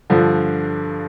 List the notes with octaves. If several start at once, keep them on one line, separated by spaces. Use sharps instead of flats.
G2 D3 F3